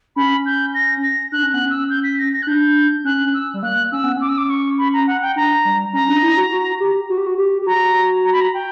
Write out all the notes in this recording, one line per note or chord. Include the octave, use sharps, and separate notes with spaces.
C#4 B5
G6
A#6
A#6
D4 F#6
C#4
B3 F#6
C#4 E6
G6
B6
A#6
A#6
F#6
D4 G6
C#4 F#6
E6
G3
A#3 F#6
C#4 E6
B3
C#4 D6
E6
D6
C#6
B5
A#5
F#5
G5
D4 A#5
G3
C#4 A#5
D4
E4
F#4
F#4
G4
F#4
G4
F#4
G4
G4
F#4 A#5
A#5
B5
A#5
G5